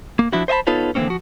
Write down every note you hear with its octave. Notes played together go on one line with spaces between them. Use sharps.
A#3
F3 D4 E4 F#4
C5 D#5 E5 A5 B5
B3 D#4 F4 A4 B4 C#5
D3 E3 F#3 A#3 C4 C#4
F3 F#4